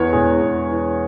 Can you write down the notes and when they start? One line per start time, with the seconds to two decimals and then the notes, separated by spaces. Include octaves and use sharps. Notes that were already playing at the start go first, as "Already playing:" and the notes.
Already playing: E2 E3 B4 C#5
0.13 E1 G#4
0.42 E2
0.71 E3